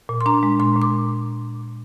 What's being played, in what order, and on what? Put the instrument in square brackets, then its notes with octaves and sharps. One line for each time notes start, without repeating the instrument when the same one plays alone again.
[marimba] A#2
C6
D4 A#5
G#3
A#2 C6
A#2
D6